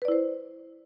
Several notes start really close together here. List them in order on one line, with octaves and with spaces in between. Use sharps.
B4 D5 E4 C5